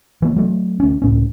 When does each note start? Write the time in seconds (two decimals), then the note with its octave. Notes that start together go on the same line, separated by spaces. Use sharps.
0.22 E3 A#3
0.36 F#3 A3 C4
0.80 D2 C#4
1.02 C#2 A2 C#4